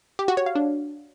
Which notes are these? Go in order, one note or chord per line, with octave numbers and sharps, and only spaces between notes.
G4
F#4
C#5
F5
D4